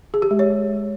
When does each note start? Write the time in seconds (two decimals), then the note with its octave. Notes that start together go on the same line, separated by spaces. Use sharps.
0.14 G#4
0.22 G4
0.31 G#3
0.39 C#5